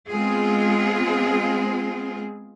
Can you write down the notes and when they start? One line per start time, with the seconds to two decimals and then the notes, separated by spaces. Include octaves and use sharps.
0.11 G#3 B3 C4 F4 G#4